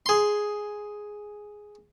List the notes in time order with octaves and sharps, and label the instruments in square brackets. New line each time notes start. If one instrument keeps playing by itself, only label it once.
[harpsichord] G#4 C6